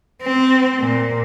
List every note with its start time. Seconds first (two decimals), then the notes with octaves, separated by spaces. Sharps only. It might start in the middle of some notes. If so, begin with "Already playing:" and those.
0.22 C4
0.80 A#2